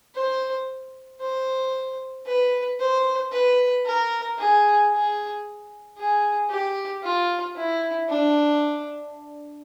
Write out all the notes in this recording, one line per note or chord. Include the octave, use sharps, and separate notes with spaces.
C5
C5
B4
C5
B4
A#4
G#4
G#4
G#4
G4
F4
E4
D4